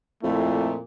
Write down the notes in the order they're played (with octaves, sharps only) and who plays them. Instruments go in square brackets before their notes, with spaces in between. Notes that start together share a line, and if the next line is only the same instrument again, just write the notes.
[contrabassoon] F2 [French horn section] A#2 [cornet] A3 [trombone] E4